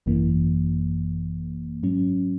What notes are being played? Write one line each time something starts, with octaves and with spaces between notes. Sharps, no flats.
G#1 F#2 E3 A#3
G#2 F#3 C#4